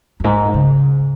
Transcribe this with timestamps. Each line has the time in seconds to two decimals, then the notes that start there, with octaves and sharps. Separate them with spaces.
0.20 F#2
0.24 G#2
0.54 C#3